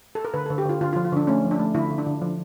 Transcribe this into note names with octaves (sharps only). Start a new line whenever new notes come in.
A4
A#4
D3 B4
D3 A4
G4
D3 F4
D3 F4
F4
F3
F4
D3 D4
A3 C#4
F3
D4
A3
D3 E4
D3
D4
D3
F3